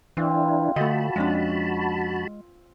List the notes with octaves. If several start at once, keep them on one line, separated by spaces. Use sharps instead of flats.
E3 C4 D4 E4 F4
D3 A3 F#4 D#5 A5 B5
F2 G#3 C#4 D4